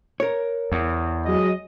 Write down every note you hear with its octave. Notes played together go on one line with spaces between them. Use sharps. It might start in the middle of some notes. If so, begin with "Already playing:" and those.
A#4 C#5
E2
F#3 G#3 D#5